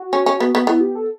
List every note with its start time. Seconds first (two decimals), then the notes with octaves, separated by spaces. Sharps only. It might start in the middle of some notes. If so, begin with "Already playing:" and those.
Already playing: F#4
0.13 C#4
0.26 C#4
0.40 B3
0.55 B3
0.67 B3 E4
0.81 G4
0.95 A4